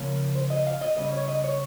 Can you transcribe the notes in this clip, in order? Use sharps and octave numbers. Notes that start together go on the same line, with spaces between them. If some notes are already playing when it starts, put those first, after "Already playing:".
Already playing: C#3 F3 A#3 C#4
C5
D#5
F5
D#5
C#3 G3 C#4 D#5
C#5
D#5
C#5